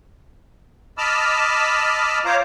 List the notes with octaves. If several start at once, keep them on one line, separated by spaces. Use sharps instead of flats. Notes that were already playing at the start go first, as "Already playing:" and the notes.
D#5 A5 B5 D6 E6 F6
F4 C5 C#5 F5 A#5 D6